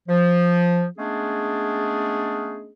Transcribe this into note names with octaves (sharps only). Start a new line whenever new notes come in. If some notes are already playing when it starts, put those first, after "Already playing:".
F3
G#3 A3 B3 C#4 D4 G#4